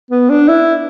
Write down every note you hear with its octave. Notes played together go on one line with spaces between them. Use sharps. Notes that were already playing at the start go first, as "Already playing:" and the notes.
B3
D4
E4